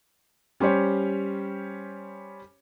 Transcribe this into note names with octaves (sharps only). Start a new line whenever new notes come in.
G3 C#4 G4 C5 C#5